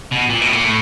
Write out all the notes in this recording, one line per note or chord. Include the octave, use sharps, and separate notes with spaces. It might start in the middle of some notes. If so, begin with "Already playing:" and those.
B2
A#2
B2
A2
A#2
A2